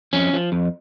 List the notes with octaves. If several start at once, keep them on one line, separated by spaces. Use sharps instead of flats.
F2 C#4
F3
F2